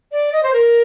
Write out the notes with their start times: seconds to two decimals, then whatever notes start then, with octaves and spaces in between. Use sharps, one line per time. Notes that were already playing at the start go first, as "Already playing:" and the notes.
0.12 D5
0.32 D#5
0.43 C5
0.53 A#4